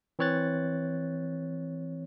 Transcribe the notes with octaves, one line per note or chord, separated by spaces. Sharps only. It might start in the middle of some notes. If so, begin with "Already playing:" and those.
E3 C4 C#5 F#6 A6